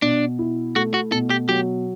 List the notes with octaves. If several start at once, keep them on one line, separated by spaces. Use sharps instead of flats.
B2 D4
E4
A3 F#4
F#4
B2 A4
G4
F#3 G4